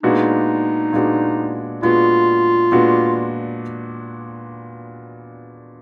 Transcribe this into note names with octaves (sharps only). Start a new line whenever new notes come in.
A#2 G#3 B3 D4 D#4 F#4
A#2 G#3 B3 D4 F#4
A#2 G#3 B3 D4 F4 F#4
A#2 G#3 B3 D4 F#4